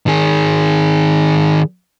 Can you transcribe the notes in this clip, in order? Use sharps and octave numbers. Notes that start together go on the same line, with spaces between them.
D#3 G#4